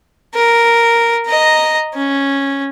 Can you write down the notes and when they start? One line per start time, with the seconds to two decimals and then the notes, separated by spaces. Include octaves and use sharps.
0.35 A#4
1.27 D#5 A#5
1.95 C#4